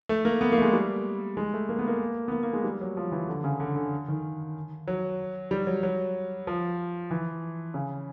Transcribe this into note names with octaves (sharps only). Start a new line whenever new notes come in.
A3
A#3
B3
A#3
A3
G#3
G3
G#3
A3
A#3
B3
A#3
B3
A#3
A#3
G#3
G3
F#3
F3
E3
D3
C#3
D3
D3
D#3
F#3
G3
F#3
F#3
F3
E3
C#3